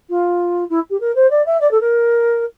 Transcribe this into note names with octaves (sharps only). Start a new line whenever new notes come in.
F4
E4
G4
A#4
C5
D5
E5
D5
A4
A#4